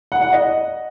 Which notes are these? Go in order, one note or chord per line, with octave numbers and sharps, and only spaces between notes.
F#5
F#5
D#5